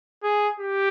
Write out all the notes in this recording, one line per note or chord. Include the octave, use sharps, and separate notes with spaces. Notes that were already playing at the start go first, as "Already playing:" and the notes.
G#4
G4